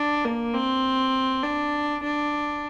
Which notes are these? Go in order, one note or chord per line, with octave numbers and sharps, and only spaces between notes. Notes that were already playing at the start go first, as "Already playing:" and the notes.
Already playing: D4
A#3
C4
D4
D4